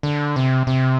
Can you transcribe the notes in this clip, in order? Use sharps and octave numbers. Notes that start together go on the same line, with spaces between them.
D3
C3
C3